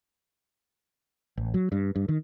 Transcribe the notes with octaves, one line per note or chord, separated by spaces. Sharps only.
A1
F#3
G2
G2
D#3